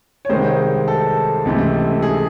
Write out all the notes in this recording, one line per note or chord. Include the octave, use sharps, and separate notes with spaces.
C#5
C2 C3 D#3 G#3 C5
A4
C#2 C3 E3 A3
G#4